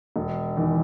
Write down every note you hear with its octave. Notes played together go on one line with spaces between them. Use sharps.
E1
E2 D#3